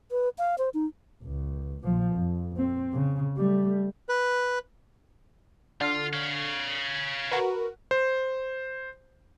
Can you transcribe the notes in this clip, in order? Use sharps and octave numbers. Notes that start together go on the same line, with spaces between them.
B4
F5
C5
D#4
C#2
A#1 F3
F2
C4
C#3
G3 A3
B4
D3 F4 F6
C#5 F5
F#4 A#4 B4
C5